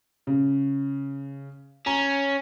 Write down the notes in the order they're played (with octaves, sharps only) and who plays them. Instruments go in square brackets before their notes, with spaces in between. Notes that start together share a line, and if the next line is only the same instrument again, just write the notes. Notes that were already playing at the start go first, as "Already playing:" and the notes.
[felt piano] C#3
[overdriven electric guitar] C#4 [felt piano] A#5